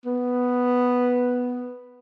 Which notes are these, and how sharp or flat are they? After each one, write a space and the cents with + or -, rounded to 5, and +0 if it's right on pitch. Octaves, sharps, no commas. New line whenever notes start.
B3 +0